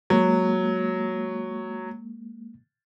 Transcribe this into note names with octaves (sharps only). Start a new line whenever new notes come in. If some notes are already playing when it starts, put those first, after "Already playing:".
F#3 G#3 A#3